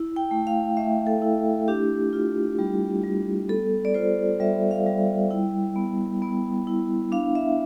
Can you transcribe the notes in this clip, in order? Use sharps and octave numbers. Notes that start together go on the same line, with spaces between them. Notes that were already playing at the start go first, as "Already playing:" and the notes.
Already playing: E4
G5
A3
F5
A3 E5
A4
E4
D4 G4
F4
G3
G3
B3 A4
D5
F4 C5
G3 E5
F5
G3
E4 G5
B3
B3
E4
D4 F5
E5